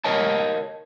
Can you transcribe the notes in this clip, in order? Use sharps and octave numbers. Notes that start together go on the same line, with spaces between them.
A#4 C#5 D#5 A5